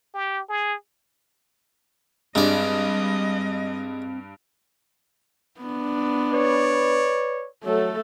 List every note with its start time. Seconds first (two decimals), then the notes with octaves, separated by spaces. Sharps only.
0.15 G4
0.49 G#4
2.35 G2 G3 G#3 C4 D5 D#5
5.61 B3 D4
6.32 B4 C#5 D5
7.65 F#3 A3 A4